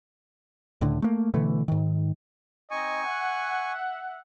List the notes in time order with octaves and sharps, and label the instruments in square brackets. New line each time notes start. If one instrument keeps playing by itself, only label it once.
[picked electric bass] C#2 A2 D3
A3 A#3
B2 D3 E3 A3
G#2 D#3
[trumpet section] C4 D#4 D#5 [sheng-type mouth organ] G#5 C#6
[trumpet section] E5 F#5